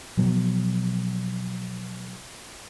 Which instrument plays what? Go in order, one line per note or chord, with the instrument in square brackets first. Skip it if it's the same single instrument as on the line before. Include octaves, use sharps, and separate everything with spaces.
[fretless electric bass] B2 F3 F#3 B3